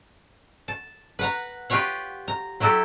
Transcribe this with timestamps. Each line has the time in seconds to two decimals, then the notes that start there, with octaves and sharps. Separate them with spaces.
0.68 A5
1.19 B4 F#5 A#5
1.70 F4 G4 B4 C#5 F#5
2.28 A#5
2.60 F#3 E4 F#4 G4 A4